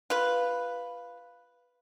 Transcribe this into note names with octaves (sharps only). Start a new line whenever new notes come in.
F4 B4